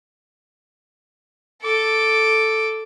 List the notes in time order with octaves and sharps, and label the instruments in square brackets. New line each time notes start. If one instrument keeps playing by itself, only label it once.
[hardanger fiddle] A4 D6